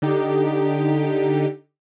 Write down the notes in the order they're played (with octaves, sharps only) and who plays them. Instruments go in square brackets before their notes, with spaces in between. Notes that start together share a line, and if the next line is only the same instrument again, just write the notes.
[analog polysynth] D3 D#4 G4